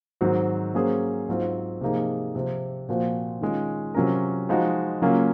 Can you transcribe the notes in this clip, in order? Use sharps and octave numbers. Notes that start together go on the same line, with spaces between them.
G#2 D#3 F#3 C4 F#4
F#3 A#3 C#4 G#4 C5
G#2 F#3 C4 F4
C3 F3 A#3 D#4 G#4
C3 F3 C4
A#2 F3 C4 F#4 C5
D#3 G#3 C#4 F4
C3 F#3 C#4 F4 A#4
F3 G#3 D#4 F#4
C#3 F#3 A#3 C#4 F4